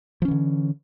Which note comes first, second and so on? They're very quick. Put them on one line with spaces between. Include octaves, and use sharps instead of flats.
F3 C#4 E3 D3